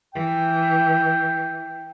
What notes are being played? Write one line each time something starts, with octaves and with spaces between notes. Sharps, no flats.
E3 G5